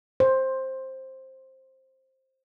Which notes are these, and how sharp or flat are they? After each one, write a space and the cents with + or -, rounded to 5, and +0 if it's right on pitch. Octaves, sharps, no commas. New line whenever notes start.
C5 +10